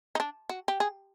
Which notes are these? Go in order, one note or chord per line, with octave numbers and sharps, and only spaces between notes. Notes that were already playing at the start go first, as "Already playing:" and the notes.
D#4
D4
F#4
G4
G#4